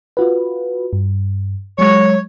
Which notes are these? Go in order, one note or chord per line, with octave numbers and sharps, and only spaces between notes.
F4 F#4 B4
G2
F#3 G#3 C#5